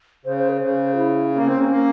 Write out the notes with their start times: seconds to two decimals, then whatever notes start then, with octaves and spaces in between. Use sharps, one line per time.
0.25 C#3 C5
0.37 C5
0.49 G#4
0.61 C#3 C5
0.94 F4
0.98 E4
1.35 A#3 C#4
1.47 C4
1.53 C#4
1.59 A#3
1.71 A#3